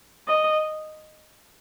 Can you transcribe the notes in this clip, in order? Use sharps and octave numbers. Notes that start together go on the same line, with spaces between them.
D#5